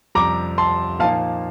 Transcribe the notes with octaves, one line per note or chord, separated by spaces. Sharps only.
F2 C3 G3 A#5 D6
A5 C6
A#2 F3 A#3 D#4 F5 A5